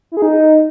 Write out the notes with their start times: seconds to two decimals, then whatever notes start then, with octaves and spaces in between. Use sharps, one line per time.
0.12 E4
0.17 G#4
0.22 D#4